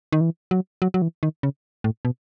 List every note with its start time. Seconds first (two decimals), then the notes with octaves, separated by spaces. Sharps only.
0.13 D#3
0.21 E3
0.51 F#3
0.82 F#3
0.94 F#3
1.02 E3
1.23 D#3
1.43 C#3
1.84 A2
2.05 B2